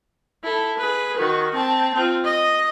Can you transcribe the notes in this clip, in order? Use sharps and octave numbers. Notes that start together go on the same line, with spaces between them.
E4 A4
G#4 B4
D#3 F#4
C4 A5
C4 F4
D#5